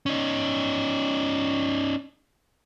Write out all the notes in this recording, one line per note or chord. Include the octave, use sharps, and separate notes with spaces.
C#4 D#4